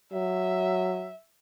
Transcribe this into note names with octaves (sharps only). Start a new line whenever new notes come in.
F#3 E5